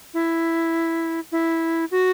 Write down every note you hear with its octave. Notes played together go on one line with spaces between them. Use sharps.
E4
E4
F#4